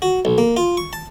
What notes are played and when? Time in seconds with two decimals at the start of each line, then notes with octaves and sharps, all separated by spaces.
0.02 F#4
0.25 B1
0.38 A#3
0.57 F4
0.77 C#6
0.93 A5